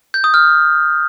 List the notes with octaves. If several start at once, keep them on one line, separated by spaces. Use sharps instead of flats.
G6
D#6
F6